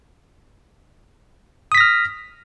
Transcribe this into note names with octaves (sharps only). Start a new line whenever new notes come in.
D#6 F6 A#6 B6